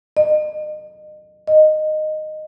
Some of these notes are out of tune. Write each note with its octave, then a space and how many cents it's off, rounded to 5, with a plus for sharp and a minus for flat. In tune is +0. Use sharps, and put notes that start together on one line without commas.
D#5 -35
D#5 -10